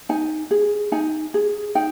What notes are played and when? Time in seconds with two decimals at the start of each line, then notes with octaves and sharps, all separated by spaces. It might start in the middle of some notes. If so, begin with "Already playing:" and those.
0.09 D#4 G#5
0.51 G#4
0.92 D#4 G#5
1.34 G#4
1.75 D#4 G5